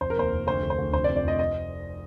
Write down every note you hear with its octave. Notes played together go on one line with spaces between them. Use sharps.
F1 C5
A#4
D#2 C5
F1
D2 C5
D3
C5
D2
F1 C5
D5
F2
D5
F1 D#5
D#5